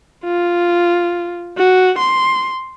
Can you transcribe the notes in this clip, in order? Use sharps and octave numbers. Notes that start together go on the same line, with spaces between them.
F4
F#4
C6